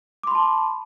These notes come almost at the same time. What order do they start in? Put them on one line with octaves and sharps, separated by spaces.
D6 C6 B5 A5